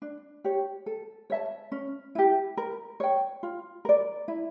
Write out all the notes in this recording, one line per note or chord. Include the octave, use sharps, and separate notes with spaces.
D4
G4 C#5
A4
C#5 E5 A5
C#4
E4 G4
A#4
C#5 G5
F4
A#4 D5
E4